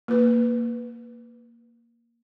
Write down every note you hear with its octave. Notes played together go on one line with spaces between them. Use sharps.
A#3 B4